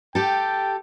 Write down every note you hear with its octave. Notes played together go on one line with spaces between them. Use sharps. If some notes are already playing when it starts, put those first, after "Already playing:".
G4 A4 G5